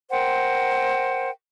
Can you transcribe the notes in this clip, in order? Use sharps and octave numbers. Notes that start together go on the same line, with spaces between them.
A#4 C5 F#5 G5